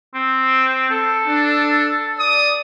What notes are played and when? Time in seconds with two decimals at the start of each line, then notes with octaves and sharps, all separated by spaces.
0.15 C4
0.90 A4
1.27 D4
2.19 D5 D#6